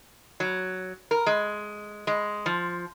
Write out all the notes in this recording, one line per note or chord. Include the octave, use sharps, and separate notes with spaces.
F#3
A#4
G#3
G#3
F3